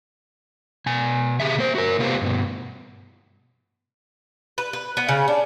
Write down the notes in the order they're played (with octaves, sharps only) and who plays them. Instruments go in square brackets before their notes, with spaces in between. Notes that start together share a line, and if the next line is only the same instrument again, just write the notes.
[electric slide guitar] B2 G#5
C#3 G4 G#4 E5
A#3 C5
F#4 A#4
C3 A#3 B3 F4 G4 C5
G2 B2
[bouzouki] B4
B4
B3
C#3
D4